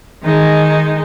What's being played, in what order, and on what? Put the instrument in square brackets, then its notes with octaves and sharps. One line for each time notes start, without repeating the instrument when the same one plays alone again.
[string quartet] D#3 G#3 D#4